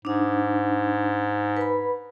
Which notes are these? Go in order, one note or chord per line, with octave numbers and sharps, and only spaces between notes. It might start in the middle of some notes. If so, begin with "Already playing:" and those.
G#2 D4 D#4
B4 B5